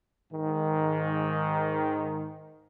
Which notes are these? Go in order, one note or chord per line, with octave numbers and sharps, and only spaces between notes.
G#2 D#3